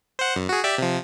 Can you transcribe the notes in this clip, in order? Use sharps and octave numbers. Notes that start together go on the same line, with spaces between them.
C5 F#5
F#2
F#4 G#4
G4 D5 E5
C3 F3